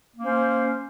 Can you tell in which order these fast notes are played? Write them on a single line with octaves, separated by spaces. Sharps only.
A#3 C#4 C5